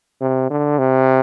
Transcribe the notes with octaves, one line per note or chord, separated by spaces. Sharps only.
C3
D3
C3